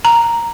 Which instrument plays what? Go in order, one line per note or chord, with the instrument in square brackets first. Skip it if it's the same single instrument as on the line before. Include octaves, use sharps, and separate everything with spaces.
[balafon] A#5